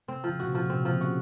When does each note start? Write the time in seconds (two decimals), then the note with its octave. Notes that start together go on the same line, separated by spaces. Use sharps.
0.08 C3 C4
0.24 C#3 F3
0.40 A#2 F#4
0.49 C3
0.55 F3
0.65 A#2
0.70 C3 C4
0.85 F3
0.90 C#3
1.01 F#4